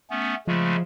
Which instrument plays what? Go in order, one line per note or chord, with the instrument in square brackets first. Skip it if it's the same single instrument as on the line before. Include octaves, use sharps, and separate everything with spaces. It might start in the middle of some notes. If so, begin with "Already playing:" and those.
[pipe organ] A3 B3 C#4
[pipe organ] C#3 G#3 A3 [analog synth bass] F3